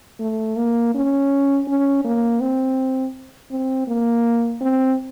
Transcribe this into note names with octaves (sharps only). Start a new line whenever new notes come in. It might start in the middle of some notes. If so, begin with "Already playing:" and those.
A3
A#3
C#4
C#4
A#3
C4
C4
A#3
C4